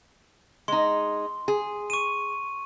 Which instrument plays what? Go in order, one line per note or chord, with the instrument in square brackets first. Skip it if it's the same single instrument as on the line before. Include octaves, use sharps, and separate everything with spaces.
[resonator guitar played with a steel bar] G#3 D#4 [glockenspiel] C6
[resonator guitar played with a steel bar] G#4
[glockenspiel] C#6 D#7